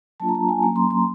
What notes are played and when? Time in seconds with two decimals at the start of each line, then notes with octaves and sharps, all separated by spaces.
0.20 F#3 A#3 D4 F4 A5
0.29 A#5
0.35 A5
0.49 G#5
0.62 F#3 A#3 C#4 A#5
0.76 C6
0.90 C6